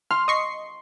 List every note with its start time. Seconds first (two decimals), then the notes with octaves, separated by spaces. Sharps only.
0.11 C6 F6
0.28 D#5 C#6 C7